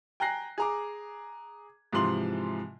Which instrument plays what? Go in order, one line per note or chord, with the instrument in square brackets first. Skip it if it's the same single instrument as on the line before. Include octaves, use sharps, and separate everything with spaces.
[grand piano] G5 G#5 A#5 F#6 A#6 C7
G#4 A#5 D6
G#2 C3 E3 F3 C6 F#7